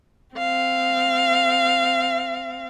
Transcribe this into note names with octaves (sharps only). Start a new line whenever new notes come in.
C4 F5